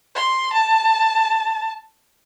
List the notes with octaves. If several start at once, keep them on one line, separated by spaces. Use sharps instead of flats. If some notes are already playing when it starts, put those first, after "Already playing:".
C6
A5